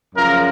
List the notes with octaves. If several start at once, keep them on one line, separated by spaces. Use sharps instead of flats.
F#2 C#3 F3 A#4